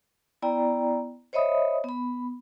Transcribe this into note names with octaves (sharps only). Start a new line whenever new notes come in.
B3 E4 D5 G5 A#5
C5 C#5 D#5 E5 B5 D#6
B3 B5